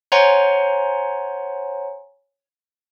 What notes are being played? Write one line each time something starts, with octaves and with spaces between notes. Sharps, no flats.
C5 C#5 F#5 G#5 A#5 C6